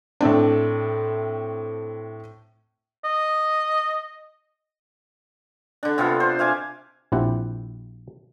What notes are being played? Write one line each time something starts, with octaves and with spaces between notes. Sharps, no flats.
A2 A3 C4 D4
D#5
D3 D4
C3 B3 F4 A4
C5
E5 F5 G#5 D6
A#1 C4 E4 G4 F#5